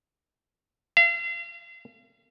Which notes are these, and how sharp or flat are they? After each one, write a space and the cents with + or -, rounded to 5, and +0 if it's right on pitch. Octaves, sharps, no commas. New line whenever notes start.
F5 -40